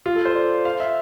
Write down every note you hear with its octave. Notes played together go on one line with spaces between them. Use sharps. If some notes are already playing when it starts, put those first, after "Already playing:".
F4
A4
C5
D5
F5
E5